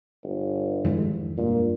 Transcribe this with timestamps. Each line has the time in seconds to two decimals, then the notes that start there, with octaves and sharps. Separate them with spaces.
0.24 G1
0.85 F2 G#2 D#3 E3 G#3
1.38 G2 A#2